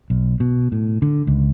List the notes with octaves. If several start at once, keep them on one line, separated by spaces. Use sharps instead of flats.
B1
B2
A2
D3
C#2